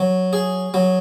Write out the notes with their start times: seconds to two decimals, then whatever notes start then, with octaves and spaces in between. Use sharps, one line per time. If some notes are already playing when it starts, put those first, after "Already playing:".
Already playing: F#3
0.33 G#4
0.74 F#3